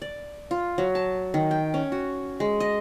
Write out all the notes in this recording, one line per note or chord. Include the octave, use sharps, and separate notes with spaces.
D5
F4
F#3
A5
D#3
G5
C#4
F#4
G#3
D#5